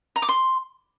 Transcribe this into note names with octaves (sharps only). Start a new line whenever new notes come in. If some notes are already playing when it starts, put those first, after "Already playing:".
A#5
D6
C6